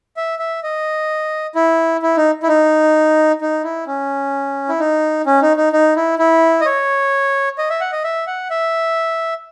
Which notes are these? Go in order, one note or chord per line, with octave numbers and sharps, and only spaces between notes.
E5
E5
D#5
E4
E4
D#4
E4
D#4
D#4
E4
C#4
E4
D#4
C#4
D#4
D#4
D#4
E4
E4
D#5
C#5
D#5
E5
F#5
D#5
E5
F#5
E5